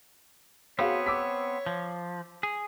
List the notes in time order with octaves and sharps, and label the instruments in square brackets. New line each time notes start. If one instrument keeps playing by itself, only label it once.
[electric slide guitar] B3 C4 [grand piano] F#4 G#4 F5 [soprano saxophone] C#5
[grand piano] D6 E6 B6
[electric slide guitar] F3
G#4